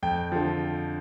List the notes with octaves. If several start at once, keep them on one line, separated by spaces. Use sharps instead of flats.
F2 G5
D3 F3